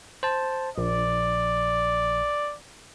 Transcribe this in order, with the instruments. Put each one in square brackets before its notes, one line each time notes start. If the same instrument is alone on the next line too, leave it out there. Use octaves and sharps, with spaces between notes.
[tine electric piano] C5 A5
[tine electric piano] A#1 [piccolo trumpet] D5